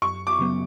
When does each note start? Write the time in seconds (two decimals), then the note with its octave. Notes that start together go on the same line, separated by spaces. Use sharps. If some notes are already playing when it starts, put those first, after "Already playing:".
0.02 F#2 C#6
0.27 D6
0.39 C#3 F#3 B3